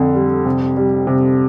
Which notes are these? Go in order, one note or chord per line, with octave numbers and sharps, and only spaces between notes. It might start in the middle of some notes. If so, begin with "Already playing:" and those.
Already playing: F2 D3
G3
C3
G3
C3